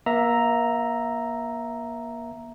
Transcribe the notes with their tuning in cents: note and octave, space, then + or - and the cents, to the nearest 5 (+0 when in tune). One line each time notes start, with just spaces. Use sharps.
A#3 +35 E5 +0 A#5 +0